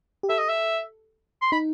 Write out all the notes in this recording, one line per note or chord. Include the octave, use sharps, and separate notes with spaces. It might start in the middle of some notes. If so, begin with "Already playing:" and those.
G4
A4 E5
D#5
E5
C6
D#4 B5